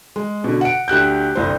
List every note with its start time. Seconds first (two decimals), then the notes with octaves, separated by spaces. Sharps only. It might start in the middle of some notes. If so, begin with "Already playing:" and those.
0.16 G#3
0.44 B2 D3
0.61 F#5 D7
0.88 D2 G4 F#6 G6
1.35 G1 C2 C5